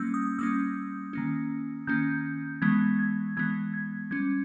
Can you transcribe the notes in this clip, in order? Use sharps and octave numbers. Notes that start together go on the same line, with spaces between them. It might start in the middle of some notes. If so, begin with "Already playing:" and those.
Already playing: G3 A#3 C#4 E6 G6
D#6
G3 A#3 C#4 E6
D#3 A#3 C#4
D#3 A#3 C#4 G6
E3 G#3 B3 G#6
G#6
E3 G#3 B3 G#6
G#6
G3 C#4 G#6